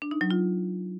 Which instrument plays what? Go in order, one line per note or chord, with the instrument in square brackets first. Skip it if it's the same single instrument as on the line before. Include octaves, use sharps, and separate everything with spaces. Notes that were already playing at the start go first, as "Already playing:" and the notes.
[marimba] D4
D#4
F#3
F4